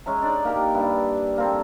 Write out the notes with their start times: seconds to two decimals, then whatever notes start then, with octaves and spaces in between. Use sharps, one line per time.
0.06 G#3 C#4 E5 A#5
0.22 D4 D#4 D5
0.45 A#3 G4 A#4
0.74 G2 E4
1.38 A#3 C4 A4